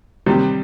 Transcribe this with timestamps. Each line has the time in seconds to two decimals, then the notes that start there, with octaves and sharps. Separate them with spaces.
0.26 C3 D#3 G3